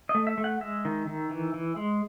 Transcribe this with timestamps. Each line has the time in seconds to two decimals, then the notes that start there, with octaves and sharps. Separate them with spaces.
0.09 D#5
0.15 A3
0.27 E5
0.38 A3
0.44 F#5
0.61 G#3 E5
0.85 D#3
1.07 D#3
1.31 E3
1.54 E3
1.76 G#3